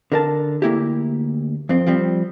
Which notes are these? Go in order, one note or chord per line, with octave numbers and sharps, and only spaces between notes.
D3 A#4 A5
D2 A#3 E4 G4
F2 C4
F3 G3 C4